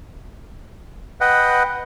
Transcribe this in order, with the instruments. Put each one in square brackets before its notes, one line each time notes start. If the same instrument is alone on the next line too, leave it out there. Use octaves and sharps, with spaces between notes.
[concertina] B4 D#5 F#5 G5